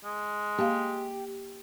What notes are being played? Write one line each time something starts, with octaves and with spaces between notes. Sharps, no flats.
G#3
A#3 G4 F5